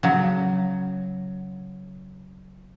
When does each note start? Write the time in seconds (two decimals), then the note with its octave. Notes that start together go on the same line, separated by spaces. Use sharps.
0.03 C#3 F#3